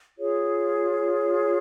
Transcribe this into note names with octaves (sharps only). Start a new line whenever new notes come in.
F4 G#4 C#5